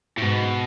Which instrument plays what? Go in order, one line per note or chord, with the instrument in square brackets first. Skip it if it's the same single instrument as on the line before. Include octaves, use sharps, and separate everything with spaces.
[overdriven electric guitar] A2
[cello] G#2 [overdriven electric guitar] B2